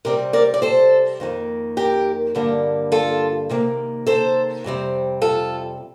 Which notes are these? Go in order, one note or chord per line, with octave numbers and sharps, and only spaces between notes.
C3 G3 C4 G4 A#4
A#4 D5
D5
A4 C5
F2 D#3 A#3
G4 A#4
G2 D3 G3 A#3
F4 A4
C3 D#3 A#3
A4 C5
F2 C3 G3 C4
F4 A4